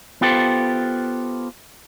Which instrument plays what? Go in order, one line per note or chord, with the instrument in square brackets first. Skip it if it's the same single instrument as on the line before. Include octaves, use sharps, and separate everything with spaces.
[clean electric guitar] B3 F4 G4 A4 C5